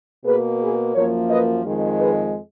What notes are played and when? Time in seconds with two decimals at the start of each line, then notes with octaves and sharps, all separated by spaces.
0.24 B2 A#3 G#4 B4
0.59 G#4 B4
0.95 F#2 F3 A#3 A#4 C#5
1.30 B4 D#5
1.65 F2 D#3 G#3
2.01 G#4 B4